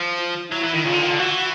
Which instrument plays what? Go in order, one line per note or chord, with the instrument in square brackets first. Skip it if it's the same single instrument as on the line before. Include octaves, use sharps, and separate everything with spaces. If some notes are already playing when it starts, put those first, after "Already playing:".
Already playing: [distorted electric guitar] F3
[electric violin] F4
[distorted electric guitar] F#3 [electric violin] E4
[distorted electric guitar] E3
D#3
[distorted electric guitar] C#3 [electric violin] F4
[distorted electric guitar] D3
D#3
D3
[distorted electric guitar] E3 [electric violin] F#4